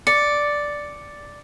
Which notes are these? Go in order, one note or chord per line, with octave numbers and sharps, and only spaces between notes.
D5 C#7